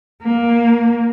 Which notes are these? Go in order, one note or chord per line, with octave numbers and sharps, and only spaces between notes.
A#3